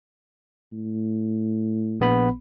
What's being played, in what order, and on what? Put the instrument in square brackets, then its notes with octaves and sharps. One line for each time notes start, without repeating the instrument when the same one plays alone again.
[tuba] A2
[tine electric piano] A#1 B3 B5